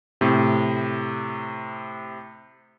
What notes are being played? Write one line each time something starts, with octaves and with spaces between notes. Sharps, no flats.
A2 C3